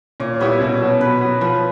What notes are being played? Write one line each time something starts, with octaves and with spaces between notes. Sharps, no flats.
A#2 C#5
G3 B3 E4 C#5
B2
F#3 B3
B2 B4
F#3 B3
F3 B4